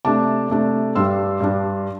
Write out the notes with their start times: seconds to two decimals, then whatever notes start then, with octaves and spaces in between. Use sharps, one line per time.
0.05 C3 A3 D4 A5 D6
0.50 C3 A3 D4
0.95 G2 G3 D4 C6 E6
1.40 G2 G3 D4